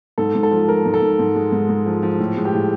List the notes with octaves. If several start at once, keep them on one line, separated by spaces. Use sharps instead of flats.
G#2 A4
G#2
A4
F3
F3 A#4
G#2
A4
G#2
G#2
G#3
G#2
G#3
F3
F3
A2
G#3
G4
A2